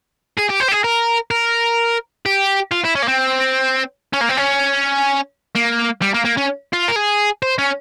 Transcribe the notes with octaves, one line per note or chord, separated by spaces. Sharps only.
G#4
G4
C5
G4
G#4
A#4
A#4
G4
F4
E4
C#4
A#3
C4
C#4
A#3
C4
C#4
A#3
G3
A#3
A#3
C#4
F4
A#4
G#4
C5
C#4